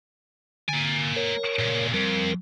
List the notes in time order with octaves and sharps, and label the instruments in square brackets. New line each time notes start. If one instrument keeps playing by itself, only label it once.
[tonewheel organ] D3 [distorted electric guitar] A#3 G#5
[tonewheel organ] A#4 C#5
[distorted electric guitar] A#2 C#3
[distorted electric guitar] F2 [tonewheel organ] G3 A#4